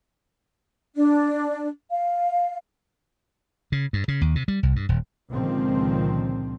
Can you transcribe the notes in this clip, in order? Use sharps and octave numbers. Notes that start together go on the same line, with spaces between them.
D4
F5
C#3
G2
C#3
D#2
C3
G3
C2
G2
D#1
C#2 A#2 D3 D#3 F3 C4